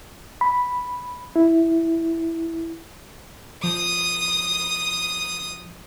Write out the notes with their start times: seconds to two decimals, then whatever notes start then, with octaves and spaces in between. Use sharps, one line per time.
0.41 B5
1.36 E4
3.64 F3 D#6